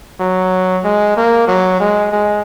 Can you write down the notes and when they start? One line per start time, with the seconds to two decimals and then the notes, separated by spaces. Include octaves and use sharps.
0.20 F#3
0.84 G#3
1.17 A#3
1.48 F#3
1.80 G#3
2.12 G#3